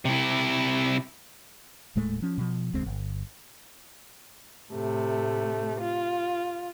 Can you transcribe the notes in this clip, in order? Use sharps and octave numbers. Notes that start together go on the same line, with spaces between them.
C3 E4
D#1 A2 G#3 A3
F3 C#4
B2 F3
F1 D2 G#3 C4
G1
A2 C3 A3
F4